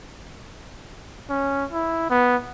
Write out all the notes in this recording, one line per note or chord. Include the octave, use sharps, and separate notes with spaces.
C#4
E4
B3